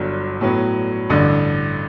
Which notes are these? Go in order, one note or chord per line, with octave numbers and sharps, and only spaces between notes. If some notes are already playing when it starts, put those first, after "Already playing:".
Already playing: G1 G2 F#3
A2 F#3 B3
A1 G2 D3